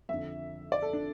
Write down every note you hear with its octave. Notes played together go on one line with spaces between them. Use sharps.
F2 D3 E5
D5
A4
D4